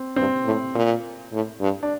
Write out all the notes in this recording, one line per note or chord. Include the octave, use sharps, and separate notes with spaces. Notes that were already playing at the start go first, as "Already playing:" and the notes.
Already playing: C4
G2 C4
A2
A#2
A2
G2
D4